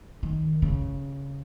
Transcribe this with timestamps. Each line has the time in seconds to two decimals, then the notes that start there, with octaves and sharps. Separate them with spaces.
0.23 D#3
0.62 C#3